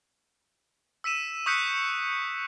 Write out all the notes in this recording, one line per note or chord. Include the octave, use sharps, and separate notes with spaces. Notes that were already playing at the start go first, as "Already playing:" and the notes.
E6 B6 D#7 E7
C#6 D#6 F#6 G6 B6 C#7